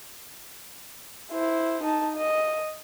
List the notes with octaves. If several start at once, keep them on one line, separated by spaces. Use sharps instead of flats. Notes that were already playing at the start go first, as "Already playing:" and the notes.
E4 C5
D#4 A5
D#5